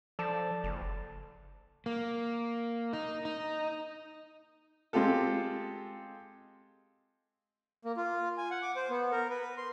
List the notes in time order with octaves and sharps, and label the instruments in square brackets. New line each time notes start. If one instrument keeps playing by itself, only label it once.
[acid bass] F3 [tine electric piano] A4 D5 A5
[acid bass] F#1
[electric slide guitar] A#3
D#4
D#4
[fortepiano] G#3 C4 F4 G4 A4
[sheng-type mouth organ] A#3
F4
G#5
F#5
D6
C5
B3
A#4
B4
C6